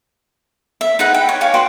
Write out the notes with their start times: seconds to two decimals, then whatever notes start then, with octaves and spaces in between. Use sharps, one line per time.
0.81 E5
0.99 D#4 G#4 B4 F#5
1.14 G5
1.29 C#5
1.41 C#5 F5 G#5 D6
1.54 F#4 B4 G5 C6